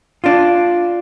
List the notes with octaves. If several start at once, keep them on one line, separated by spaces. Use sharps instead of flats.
D4 F4